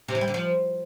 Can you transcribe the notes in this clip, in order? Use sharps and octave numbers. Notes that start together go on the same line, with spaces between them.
C3
E3
G3
D3
F3